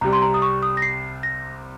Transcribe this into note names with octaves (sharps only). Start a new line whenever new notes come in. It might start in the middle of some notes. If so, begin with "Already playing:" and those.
C2 C3 G3 A#5
C6
A#5
D#6
C#6
D#6
A#6
C7
A#6